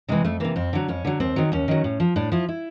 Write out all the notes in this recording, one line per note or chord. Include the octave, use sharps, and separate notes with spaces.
C3 E3 G#3
F2 A3
C3 E3 A#3
F2 C4
D3 F#3
F2 C#4
D3 F#3
D#2 C4
D#3 F#3
D#2 C#4
D#3 F#3
A2
F3
A2 D4
F3 E4
E4